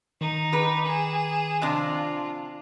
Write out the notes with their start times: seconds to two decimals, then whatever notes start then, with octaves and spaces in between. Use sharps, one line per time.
0.21 D#3 D#4
0.52 G4 B4
0.86 G#4 E7
1.62 C3 F3 D4 F4